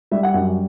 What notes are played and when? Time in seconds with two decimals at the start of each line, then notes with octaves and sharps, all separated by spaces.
0.11 G3 E5
0.23 F#5
0.34 F#2 F#5